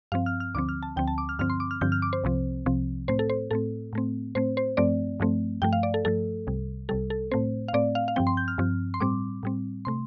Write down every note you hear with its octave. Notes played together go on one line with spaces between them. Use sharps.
G2 F3 C4 F5
F6
F6
D2 D3 F3 C4 D6
F6
A5
D2 D3 F3 C4 G5
A5
D6
F6
G2 D3 F3 C4 F6
C6
D6
F6
G2 D3 F3 C4 G6
F6
D6
C5
C2 C3 F3 C4
C2 C3 F3 C4
A2 A3 C4 C5
A4
C5
A2 A3 C4 A4
A2 A3 C4
A2 A3 C4 C5
C5
G2 F3 A3 C4 D5
G2 F3 A3 C4
G2 F3 A3 G5
F5
D5
A4
G2 F3 A3 A4
C2 C3 G3
C2 C3 G3 A4
A4
A2 A3 C4 C5
F5
A2 A3 C4 D5
F5
F5
G2 F3 C4 G5
C6
G6
F6
G2 F3 C4
C6
A2 G3 C4 D6
A2 G3 C4
C3 A3 C6